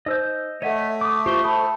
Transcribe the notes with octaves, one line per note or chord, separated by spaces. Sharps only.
D#4 C5 D#5 E6 G6
A3 A4 C#5 D#5 E5 F#5 D#7
D6 D#6
F4 G4 C5 C#6 G7
A4 C5 A5 B5 D#6